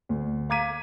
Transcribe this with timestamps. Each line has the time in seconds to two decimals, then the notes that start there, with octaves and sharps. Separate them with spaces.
0.09 D2
0.49 F5 A#5 D6 G#6 B6 D#7